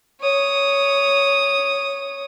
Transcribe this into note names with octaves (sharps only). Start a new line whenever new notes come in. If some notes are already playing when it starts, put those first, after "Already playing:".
C#5 D#6